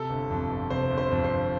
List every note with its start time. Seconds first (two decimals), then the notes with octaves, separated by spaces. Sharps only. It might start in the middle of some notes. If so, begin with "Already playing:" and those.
Already playing: C3 A4
0.10 G1
0.30 F2
0.51 G1
0.70 C3 C5
0.90 G1
0.98 C5
1.11 F2
1.24 C5
1.31 G1